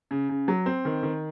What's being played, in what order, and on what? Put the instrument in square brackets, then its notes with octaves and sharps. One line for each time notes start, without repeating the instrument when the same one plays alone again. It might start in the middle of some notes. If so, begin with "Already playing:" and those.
[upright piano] C#3
C#3
F#3
C4
D#3
D#3